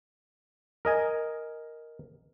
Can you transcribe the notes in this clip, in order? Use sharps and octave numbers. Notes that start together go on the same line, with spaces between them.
A#4 D#5 G#5